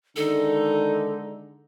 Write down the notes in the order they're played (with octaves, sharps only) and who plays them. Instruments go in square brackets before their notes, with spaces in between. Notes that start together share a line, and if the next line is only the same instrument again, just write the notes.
[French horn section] D3 G#3 [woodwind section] D#3 D#4 [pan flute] A4